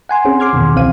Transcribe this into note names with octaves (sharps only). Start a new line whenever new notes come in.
F#5 G#5 C6
C4 C#4 G#4
C6 D6 F6 G#6
E2 B2 D#3
C2 E3 C4 C5 F5 D#7